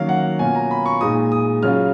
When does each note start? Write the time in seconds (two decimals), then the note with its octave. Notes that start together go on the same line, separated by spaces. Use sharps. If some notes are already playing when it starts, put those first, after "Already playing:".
Already playing: D#3 F#3 A#3 C#4 F5
0.09 F#5
0.39 B2 A#3 C#4 F4 G#5
0.55 A#5
0.71 B5
0.86 C#6
1.01 A#2 G#3 D#4 D#6
1.32 D#6
1.63 C#3 F#3 C#4 F4 F6